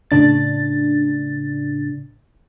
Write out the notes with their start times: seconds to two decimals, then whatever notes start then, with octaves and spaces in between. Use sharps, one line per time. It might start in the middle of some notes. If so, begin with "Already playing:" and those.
0.11 A2 C#3 D4 A6